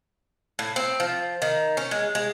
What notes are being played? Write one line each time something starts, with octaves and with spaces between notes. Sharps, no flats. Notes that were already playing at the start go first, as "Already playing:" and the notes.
A2
C4
F3
D#3
C#4
G#3
G#3